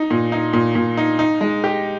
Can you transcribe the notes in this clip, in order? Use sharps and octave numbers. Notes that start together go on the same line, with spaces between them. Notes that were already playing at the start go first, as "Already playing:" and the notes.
Already playing: D#4
A#2
D#4
A#2
A#2
D#4
D#4
G#3
G4